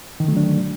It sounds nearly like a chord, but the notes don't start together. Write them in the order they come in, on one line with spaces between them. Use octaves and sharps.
D#3 D3 A3 F#3 D4